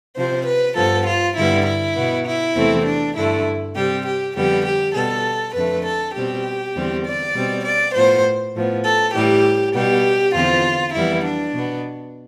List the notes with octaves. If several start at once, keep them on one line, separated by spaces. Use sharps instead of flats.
C3 F3 C4 C5
B4
G2 F3 B3 A4
F4
G2 D3 G3 B3 E4
E4
B2 B3
E4
E2 C3 E3 A3 C4
D4
G2 D3 A3 E4
C3 G3 C4 G4
G4
F2 D3 G3 B3 G4
G4
B2 G3 B3 A4
F2 D3 A3 B4
A4
B2 G3 C4 G4
E2 D3 G3 C4
D5
B2 G3 C4
D5
A2 F3 B3 C5
A2 F3 B3
A4
A2 E3 G3 G4
B2 G3 B3 G4
E2 D3 F3 C4 F4
F2 E3 G3 B3 E4
D4
B2 B3